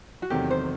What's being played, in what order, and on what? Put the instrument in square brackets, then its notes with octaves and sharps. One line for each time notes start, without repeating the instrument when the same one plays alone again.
[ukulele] F#4
[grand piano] E2 C3 D#3 F#3 A3 [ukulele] G4
[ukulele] C5